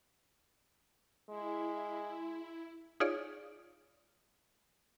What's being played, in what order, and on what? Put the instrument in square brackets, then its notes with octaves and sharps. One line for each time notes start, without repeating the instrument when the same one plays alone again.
[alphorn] G#3 [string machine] E4
[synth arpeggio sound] D#4 F4 G#4 C#5 D5